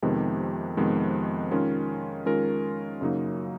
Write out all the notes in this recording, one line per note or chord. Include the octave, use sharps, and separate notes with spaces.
F2 C3 D#3 G#3 B3
F2 C3 D#3 G#3 B3
D#3 G#3 C#4 F4 A#4
D#3 G#3 C#4 F4 A#4
F#2 C#3 F#3 A#3 D#4